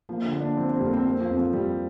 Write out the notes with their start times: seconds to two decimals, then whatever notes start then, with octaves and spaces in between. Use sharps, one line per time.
0.09 F3 A#3
0.24 D3
0.33 A#3
0.41 D4
0.57 F3 C4
0.69 C4
0.76 G3
0.81 F2 A#3
0.93 C4
1.05 A#3 C4
1.21 F3
1.30 F2
1.37 F3
1.53 F2 G3